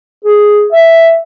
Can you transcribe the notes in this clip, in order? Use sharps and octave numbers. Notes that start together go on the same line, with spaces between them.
G#4
E5